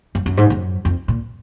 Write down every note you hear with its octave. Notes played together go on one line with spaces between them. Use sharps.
F#2
F#2
G#2
F#2
F2
A#2